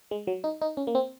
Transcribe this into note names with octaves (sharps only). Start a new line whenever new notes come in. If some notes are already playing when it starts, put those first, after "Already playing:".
G#3
F#3
D#4
D#4
C#4
A#3
C4